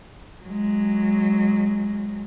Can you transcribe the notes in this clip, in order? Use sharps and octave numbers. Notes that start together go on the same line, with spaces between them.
F#3 G#3